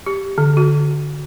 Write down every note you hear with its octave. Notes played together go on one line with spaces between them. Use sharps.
G4
D3
F#4